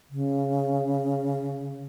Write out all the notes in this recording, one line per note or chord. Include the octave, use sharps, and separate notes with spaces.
C#3